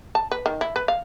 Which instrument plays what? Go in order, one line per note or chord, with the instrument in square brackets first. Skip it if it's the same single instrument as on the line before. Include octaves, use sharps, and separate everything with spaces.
[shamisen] A5
B4
D#3
E4
B4
F5